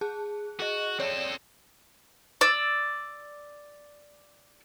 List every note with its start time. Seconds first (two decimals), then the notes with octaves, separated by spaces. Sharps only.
0.01 G#4 A5 F#6
0.60 F#4 G#4 D#5
1.00 C4 A4 C#5 D5
2.41 D5 E6